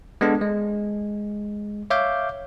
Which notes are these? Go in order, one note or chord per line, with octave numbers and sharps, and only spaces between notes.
G#3 B3 D4 A4
G#3
C#5 E5 F5 D6 G6